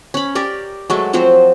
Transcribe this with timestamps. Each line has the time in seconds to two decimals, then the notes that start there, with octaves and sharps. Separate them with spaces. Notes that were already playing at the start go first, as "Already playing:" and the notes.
0.14 C#4 B5
0.35 G4 A#4 D5
0.90 F#3 G#3 A3
1.13 F3 F#3 C4 C5